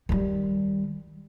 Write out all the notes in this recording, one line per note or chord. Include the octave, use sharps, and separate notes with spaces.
D#3 G3